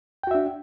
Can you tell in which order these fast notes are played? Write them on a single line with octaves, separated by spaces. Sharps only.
G5 F#4 E5 D4